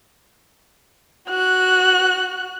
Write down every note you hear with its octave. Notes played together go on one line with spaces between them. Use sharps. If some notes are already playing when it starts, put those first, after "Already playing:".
F#4 F#6